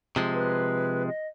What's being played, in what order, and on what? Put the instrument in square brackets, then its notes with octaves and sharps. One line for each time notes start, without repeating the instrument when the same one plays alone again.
[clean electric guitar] C3 F3 G#3
[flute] B4
D#5